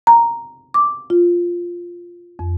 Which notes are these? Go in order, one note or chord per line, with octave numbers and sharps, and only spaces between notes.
A#5
D6
F4
F2